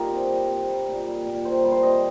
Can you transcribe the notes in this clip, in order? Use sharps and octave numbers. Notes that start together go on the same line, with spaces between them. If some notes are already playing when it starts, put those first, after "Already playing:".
Already playing: A#2 G3 D#4 F4 G4 A#4
C3
G3
C3
G3
A#2
G3
A#2
D#3 C5
G3
C5
C3 D#5